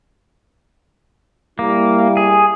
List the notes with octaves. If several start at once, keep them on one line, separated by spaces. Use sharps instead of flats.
G3 A#3 E4
G#4